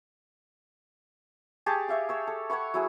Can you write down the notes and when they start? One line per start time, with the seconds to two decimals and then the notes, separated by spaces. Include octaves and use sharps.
1.66 G4 G#4 C#5 A5
1.88 C#5 E5 F5 D6
2.09 C#5 E6
2.27 A4
2.50 C#5 F#5 B5 C#6
2.74 F#3 E4 G#4